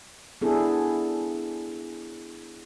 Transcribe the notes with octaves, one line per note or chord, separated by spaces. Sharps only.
B3 D4 E4 G#4 A4